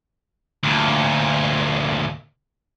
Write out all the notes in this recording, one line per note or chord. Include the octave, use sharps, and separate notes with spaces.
D2 A#2